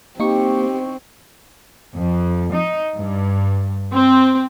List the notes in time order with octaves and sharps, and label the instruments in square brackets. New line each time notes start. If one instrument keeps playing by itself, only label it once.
[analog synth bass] A#3 [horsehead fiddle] C4 [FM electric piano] D#4 C#6 [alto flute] G4
[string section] F2
D#4
G2
C4